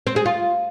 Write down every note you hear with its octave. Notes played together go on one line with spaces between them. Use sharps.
C4
G#4
F4